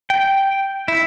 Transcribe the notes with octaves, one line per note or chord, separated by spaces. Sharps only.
G5
E4